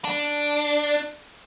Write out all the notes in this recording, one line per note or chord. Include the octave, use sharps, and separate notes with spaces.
D4